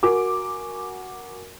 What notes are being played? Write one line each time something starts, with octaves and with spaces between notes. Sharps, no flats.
F#4 A#4 G#5 D6